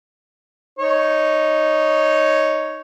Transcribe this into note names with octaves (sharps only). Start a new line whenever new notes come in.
D#4 C#5